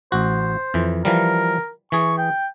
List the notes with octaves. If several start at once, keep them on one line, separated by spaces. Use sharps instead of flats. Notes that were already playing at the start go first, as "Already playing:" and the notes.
A1 F#4 C5
F2 E3
E3 F3 G3 A#4
E3 G#4 C#6
G5